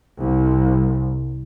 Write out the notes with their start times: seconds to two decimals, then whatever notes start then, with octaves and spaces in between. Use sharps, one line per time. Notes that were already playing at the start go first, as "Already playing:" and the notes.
0.21 C2